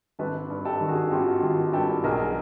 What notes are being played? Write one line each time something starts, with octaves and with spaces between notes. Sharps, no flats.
G#1 A4 B4
G2
G4 A4
D#3
F#4 G#4
G#1 F4 G4
G#1 F4 G4
G2 G4 A4
B1 G#4 A#4